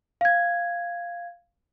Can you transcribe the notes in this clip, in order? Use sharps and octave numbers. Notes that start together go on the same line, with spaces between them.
F5 G#6